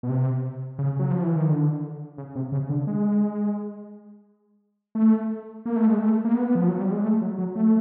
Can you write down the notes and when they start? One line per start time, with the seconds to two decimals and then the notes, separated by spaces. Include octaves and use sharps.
0.03 B2
0.09 C3
0.79 C#3
0.99 F#3
1.11 F3
1.23 E3
1.36 D#3
1.48 D3
2.18 C#3
2.35 C3
2.52 C#3
2.70 D3
2.87 G#3
4.95 A3
5.65 A#3
5.76 A3
5.87 G#3
5.99 A3
6.24 A#3
6.34 B3
6.55 F3
6.68 F#3
6.80 G3
6.92 G#3
7.04 A3
7.22 F#3
7.38 F#3
7.55 A3